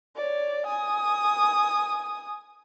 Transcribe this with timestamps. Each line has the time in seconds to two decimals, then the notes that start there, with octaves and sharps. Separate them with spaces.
0.16 C#5 D5
0.66 G#5 D#6